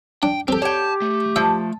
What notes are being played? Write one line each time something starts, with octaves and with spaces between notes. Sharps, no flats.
D4 G5
C4 G4 A4
G4 C#5 G5 A5
A3
F3 E5